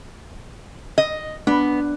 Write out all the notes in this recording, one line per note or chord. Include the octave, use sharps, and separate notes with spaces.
D#5
B3 D4